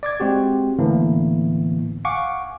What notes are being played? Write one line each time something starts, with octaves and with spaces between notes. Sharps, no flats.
D5 D6 G#6
G#3 C4 F#4 G4
A2 D3 E3 A#3 B3
F5 F#5 G#5 C#6 D6